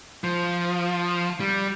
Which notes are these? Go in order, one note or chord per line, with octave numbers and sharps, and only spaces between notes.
F3
G3